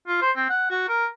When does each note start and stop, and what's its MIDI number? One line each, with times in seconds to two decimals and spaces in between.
0.07 0.19 65
0.22 0.31 72
0.36 0.47 60
0.49 0.68 78
0.70 0.87 66
0.89 1.06 70